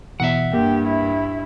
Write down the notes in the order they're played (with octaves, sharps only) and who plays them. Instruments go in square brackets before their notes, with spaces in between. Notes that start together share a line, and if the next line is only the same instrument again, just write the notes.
[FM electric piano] B2 E3 [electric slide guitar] E5 F#5
[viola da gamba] G2 [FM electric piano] A#3 [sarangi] G4
[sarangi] E4